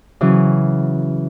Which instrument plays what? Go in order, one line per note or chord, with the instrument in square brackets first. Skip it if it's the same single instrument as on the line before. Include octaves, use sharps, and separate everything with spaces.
[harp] C#3 E3 F#3